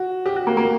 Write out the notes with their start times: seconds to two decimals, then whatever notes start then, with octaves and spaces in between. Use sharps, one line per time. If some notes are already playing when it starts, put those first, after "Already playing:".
Already playing: F#4
0.26 G4
0.36 F#4
0.47 A#3
0.57 A#3